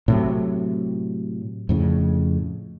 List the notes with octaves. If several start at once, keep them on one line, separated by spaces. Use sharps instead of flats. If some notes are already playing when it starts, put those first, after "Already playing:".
A2 C3 F#3
F2 A2 C#3